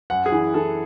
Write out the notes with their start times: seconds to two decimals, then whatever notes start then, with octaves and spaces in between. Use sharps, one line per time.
0.10 F#2 F#5
0.26 G#4
0.32 E3
0.54 E3 A4